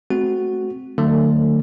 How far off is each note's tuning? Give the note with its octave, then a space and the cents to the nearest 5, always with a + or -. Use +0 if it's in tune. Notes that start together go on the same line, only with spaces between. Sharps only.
A3 -35 C4 +0 F#4 +0
D3 +45 F#3 +0 A3 +35